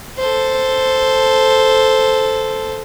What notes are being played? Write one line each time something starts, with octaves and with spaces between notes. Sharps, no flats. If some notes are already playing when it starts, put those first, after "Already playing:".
A4 C5